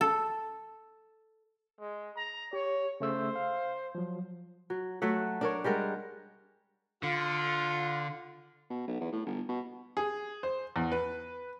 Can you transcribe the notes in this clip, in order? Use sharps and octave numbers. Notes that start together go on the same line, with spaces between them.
A4
G#3
A#5
G4 C#5
C#3 A3 C5 E6
F5
F3 F#3
F#3
F#3 A3 E5 F#5
D4 A#4 C#5
G3 G#3 A#4 F#5
D3 F4
B2
B1
E2
A2
G1
B2
G#4
C5
E2
B4